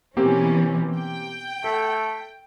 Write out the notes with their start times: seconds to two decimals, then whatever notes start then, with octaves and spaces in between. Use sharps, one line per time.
0.17 B2 E3 A#3 C4 C#4 G4
0.97 G5
1.64 A3 A4